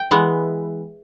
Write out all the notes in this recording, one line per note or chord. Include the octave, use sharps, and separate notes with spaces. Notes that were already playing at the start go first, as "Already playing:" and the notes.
Already playing: G5
E3 G#3 B3